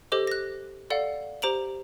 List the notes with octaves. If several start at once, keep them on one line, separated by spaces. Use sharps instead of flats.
G4 A4 C5 D#5 D6
F#6 A#6
A4 D5 F5 F#5
G4 C5 A#5 D7 F7 F#7